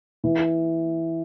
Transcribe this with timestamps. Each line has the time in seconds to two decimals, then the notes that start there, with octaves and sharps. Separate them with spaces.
0.24 E3